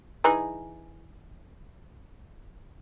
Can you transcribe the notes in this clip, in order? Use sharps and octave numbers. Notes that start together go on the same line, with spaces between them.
E3 D#4 G#4